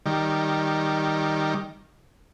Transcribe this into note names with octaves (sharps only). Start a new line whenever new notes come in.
D#3 G3